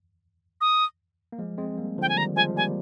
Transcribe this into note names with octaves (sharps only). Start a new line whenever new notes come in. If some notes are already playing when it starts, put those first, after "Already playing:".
D#6
A#3
F3 G#3
G#3 C4
G3 A#3
D3 F3 G5
G#5
D#3 G3 A#5
F3 G#3 G#5
G3 A#3 G#5